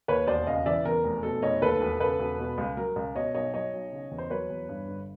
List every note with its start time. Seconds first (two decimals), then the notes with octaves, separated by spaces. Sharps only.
0.08 D#2 B4 C#5
0.27 E1 C5 D5
0.47 C#3 D#5 F5
0.66 E3 D5 E5
0.85 E2 A#4
1.04 F1
1.23 B2 A4
1.42 F1 C#5 D#5
1.62 D#2 A4 B4
1.81 E1
2.00 C#3 A4 B4
2.19 E1
2.39 B2
2.58 C#2
2.77 F#3 A#4
2.96 C#2
3.15 B2 C#5 D#5
3.35 B1 C#5 D#5
3.54 F#3 C#5 D#5
3.73 B1
3.92 C#3
4.11 E2
4.18 C5
4.30 F#3 B4 C#5
4.50 E2
4.69 G2
4.88 G1